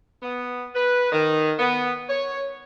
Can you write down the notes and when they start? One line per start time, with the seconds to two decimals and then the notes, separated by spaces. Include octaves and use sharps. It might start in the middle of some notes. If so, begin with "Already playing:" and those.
0.22 B3
0.74 B4
1.12 D#3
1.59 B3
2.08 C#5